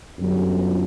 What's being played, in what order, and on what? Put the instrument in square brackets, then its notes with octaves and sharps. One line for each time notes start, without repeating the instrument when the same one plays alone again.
[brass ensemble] G1 F#2